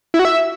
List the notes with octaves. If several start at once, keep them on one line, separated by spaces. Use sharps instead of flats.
E4
F#4
E5